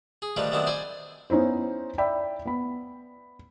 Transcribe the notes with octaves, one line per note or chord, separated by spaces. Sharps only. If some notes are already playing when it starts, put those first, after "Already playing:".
G#4
D#3 F3 G3 A3 D4 B4
F#2 C3 D#3 B3 D4 E4
C5 D5 G#5 B5
B3 C#4 D#4 E4 C5
D5 E5 G5 B5
B3 B5